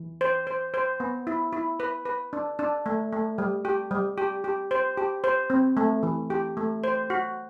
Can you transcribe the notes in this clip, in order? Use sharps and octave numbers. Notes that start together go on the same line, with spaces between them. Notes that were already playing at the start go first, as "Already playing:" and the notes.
Already playing: E3
C5
C5
C5
B3
E4
E4
B4
B4
D4
D4
A3
A3
G3
G4
G3
G4
G4
C5
G4
C5
C4
A3
E3
G4
A3
C5
F#4